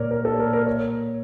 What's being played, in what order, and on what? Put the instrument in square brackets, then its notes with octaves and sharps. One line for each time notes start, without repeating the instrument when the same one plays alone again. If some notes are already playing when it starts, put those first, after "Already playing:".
Already playing: [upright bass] A#2 [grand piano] A#4 C#5 D5
[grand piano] A#4
A4
A#4
A#4
C#5